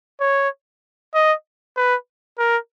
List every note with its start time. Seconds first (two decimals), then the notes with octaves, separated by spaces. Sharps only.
0.21 C#5
1.14 D#5
1.77 B4
2.39 A#4